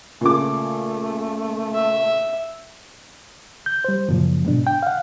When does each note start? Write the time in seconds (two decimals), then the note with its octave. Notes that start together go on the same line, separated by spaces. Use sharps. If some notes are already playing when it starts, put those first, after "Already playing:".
0.21 A#2 C#3 A3 D6
1.74 E5
3.66 G6
3.84 G3 C5
4.09 F#2 A#2 C#3 F3
4.45 G#2 B2 D4
4.67 G5
4.83 F5 F#5